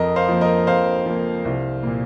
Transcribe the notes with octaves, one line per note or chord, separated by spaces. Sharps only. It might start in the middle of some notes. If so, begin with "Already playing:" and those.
Already playing: F2 A#4 D#5
C5 F5
F3 A#3
A#4 D#5
F2 C5 F5
F3 A#3
C2
A#2 A#3